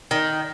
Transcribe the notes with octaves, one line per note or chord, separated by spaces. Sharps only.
D#3